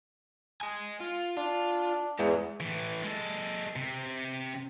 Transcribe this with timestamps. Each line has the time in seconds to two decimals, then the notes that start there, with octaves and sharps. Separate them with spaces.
0.61 D#5 G#5
1.00 F4
1.37 D4 F4
2.19 E2 G#2
2.60 A2 E3
3.04 G#3 A4
3.76 C3